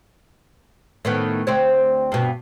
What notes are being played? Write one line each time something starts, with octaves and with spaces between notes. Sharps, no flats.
A2 D#3 B3
D2 C4 C#5
G2 B2